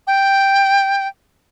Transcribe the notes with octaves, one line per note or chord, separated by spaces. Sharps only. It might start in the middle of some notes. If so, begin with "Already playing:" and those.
G5